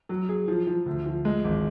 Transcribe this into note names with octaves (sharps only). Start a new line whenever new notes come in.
F#3
G#4
F3
F3
D2
F3
G#3
G#1